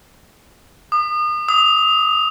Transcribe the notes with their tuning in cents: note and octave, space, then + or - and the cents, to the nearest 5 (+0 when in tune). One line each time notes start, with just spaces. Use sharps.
D#6 -35
D#6 +35